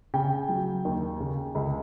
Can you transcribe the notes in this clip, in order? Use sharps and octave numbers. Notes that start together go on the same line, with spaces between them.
C#3 G5
F#3
D#2
C#3
C#2